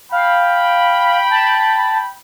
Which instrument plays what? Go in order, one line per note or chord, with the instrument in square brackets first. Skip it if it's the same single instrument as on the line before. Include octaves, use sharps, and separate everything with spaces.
[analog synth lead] F5 [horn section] G5 B5
[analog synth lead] A5